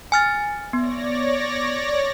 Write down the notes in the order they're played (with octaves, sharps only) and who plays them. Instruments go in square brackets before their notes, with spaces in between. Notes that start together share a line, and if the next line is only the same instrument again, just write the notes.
[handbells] G#5 F6 A6
[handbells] B3 [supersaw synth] C#5 D5 A#6